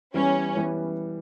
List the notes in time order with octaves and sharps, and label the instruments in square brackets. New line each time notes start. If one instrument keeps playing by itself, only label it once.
[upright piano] E3 G3 B3 [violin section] C#4
[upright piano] E3 G3 B3